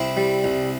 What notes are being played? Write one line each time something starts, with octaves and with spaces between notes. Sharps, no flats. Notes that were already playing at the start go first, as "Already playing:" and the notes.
Already playing: C2 C4 E4
G3
C2